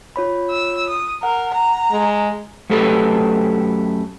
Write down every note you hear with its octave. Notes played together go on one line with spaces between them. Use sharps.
F4 C#5 B5
E6
D#6
A#4 F#5
A#5
G#3
F#2 A3 G4 A4 B4